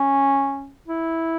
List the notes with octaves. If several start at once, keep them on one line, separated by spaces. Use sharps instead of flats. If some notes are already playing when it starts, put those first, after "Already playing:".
Already playing: C#4
E4